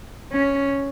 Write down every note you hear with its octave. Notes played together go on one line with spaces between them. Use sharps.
C#4